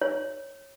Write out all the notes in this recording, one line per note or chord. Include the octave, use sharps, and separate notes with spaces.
C#5